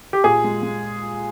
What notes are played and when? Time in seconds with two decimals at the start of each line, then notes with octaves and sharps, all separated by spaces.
0.13 G4
0.24 A#2 G#4
0.44 G#3
0.63 G#3